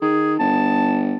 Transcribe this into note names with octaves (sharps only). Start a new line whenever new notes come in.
D#3 G#4
G1 A5